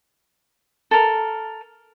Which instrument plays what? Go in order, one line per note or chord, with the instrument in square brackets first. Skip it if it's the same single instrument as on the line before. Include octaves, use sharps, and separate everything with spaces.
[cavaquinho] A4 A#4